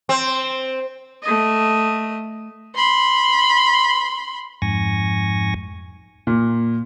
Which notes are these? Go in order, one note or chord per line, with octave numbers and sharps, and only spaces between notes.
C4
A3 D#5
B5 C6
F2 G#2 G#5 C#6 A#6
A#2